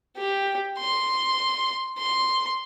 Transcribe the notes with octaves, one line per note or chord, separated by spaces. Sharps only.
G4
C6
C6